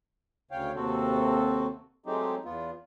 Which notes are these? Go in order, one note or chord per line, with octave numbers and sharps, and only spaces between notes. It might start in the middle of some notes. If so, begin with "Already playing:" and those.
D2 C#3 C#5 F5 G5
D#2 C3 C4 F#4 A4
F#3 G#3 A3 C4 D#4 G4
E2 B3 F4